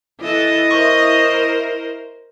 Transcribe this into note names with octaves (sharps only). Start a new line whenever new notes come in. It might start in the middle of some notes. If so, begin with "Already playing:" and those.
E3 E4 A4 D#5
A#4 C5 C#6